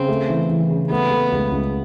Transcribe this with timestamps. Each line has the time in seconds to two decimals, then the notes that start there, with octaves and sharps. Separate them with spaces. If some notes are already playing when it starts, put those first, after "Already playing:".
Already playing: C#3 C4
0.08 A3
0.29 E3
0.49 E3
0.70 C#3
0.90 A3 B3
1.11 A3
1.32 C#2
1.52 C#2